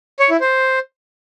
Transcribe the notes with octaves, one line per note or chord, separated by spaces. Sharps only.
C#5
E4
C5